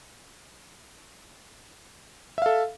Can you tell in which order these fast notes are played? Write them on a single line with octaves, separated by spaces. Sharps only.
E5 F5 A4